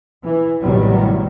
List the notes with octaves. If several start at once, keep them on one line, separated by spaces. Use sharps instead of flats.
E3
A1 E2 C3 D#3 F#3 G3